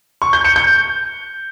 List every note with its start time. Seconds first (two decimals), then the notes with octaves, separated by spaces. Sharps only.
0.22 C#6
0.33 G6
0.45 C#7
0.56 G6